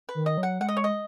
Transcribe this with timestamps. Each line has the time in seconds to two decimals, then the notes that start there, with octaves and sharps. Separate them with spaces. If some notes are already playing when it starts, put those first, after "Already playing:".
0.09 B4
0.15 D#3
0.26 D#5
0.38 F#3
0.43 F#5
0.60 G#3 F#5
0.69 D#5
0.77 C#5
0.84 D#5